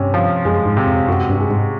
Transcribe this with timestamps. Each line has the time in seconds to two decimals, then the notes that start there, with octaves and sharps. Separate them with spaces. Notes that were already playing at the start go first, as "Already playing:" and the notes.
Already playing: G2 C3 C#4
0.14 F3
0.45 F#2 G#3
0.66 G#2
0.77 C3
0.87 F2
1.08 F#2 F#4
1.29 G2
1.40 G#3
1.50 G#2